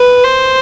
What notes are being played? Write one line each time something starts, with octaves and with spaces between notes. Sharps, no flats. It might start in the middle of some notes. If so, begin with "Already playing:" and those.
Already playing: B4
C5